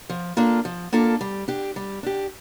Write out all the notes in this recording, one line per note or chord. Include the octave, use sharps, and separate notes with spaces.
F3
A#3 D4 F4 A4
F3
A#3 D4 F4 A4
G3
D4 G4
G3
D4 G4